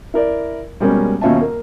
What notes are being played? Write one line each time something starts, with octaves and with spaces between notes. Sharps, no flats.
E4 A#4 D5
B2 G3 G#3 A#3 C#4
D#2 B2 C#4 F4 E5 A5
A#3